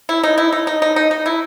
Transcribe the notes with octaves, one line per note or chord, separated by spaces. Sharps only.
E4
D#4
E4
D#4
D#4
D#4
D#4
D#4
E4